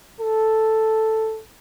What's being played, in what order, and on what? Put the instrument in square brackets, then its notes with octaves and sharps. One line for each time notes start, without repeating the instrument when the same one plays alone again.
[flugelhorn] A4